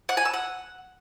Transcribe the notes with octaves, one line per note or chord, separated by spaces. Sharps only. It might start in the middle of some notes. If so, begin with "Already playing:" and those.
F#5
G#5
E6
F#5